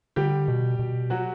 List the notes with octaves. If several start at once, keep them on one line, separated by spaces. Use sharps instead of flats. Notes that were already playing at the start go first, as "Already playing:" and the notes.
D3 G3 G4
B2
B2
F#3 F#4